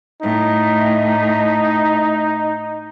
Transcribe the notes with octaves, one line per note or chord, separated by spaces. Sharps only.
A2 D#4